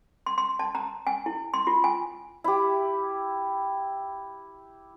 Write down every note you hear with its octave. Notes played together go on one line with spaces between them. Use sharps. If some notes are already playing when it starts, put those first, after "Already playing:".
C6
C6
A5
A#5
G#5
E4
C6
F4
G#5
E4 G4